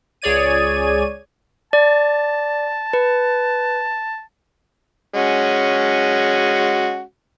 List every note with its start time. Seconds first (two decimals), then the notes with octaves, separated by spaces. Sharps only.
0.22 C#2 G#4 C#5 D5 G#6 D#7
1.73 D5 A5
2.93 B4
5.14 G#3 C#4 F#4